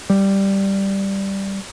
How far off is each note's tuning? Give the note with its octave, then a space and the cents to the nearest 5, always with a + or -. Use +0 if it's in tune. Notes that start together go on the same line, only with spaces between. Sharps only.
G3 +0